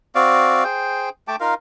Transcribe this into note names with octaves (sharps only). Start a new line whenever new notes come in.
C4 F#4 D5 F5
G#4 C5 G5
A3 G5 A5 D6
D#4 F4 A#4 F5